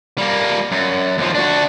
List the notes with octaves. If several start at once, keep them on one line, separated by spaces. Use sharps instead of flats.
G3 A#3
F#2
D#2 F3
D4 F#4